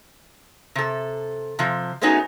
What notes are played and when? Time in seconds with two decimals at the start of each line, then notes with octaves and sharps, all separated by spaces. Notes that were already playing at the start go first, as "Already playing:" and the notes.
0.75 C3 A4
1.59 C3 F3
2.01 G#3 A3 B3 C#4 D#4 F#4